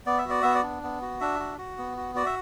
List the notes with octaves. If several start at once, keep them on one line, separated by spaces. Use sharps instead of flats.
B3 D5
E5
F#4 D5
B3 E5
D5
D4
B3
F#4
D4 E5
F#4
F#4
B3
F#4
F#4 D5
E5